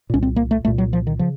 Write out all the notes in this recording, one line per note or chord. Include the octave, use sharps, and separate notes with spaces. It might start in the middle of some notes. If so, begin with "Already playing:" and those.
C2 A#2 C#4
C4
A#3
A3
C2 A#2 A3
F#3
F3
D#3
C#3 F3